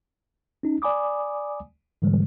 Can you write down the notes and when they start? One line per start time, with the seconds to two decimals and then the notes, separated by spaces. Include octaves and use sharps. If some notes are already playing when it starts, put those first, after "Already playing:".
0.63 C#4 D#4
0.82 D5 G#5 B5 D6 D#6
2.02 G#2 D3 E3 G3 G#3